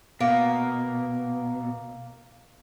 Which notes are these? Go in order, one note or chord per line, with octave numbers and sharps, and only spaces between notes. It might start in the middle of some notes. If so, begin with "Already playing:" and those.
B2 A#3